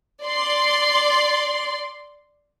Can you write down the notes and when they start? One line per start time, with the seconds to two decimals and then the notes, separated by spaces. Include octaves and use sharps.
0.23 D5 C6